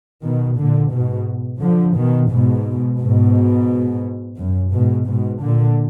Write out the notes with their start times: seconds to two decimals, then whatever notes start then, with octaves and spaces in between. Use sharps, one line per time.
0.24 B2 D#3
0.59 A#2 D3
0.94 G#2 B2
1.62 D3 F3
1.96 B2 D#3
2.31 G#2 B2
3.00 G#2 B2
4.38 F#2
4.73 G#2 B2
5.07 G#2 B2
5.42 A#2 D3